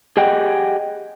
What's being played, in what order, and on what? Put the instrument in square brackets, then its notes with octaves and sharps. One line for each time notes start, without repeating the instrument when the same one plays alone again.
[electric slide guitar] G4 G#4 D#5 F#5 G5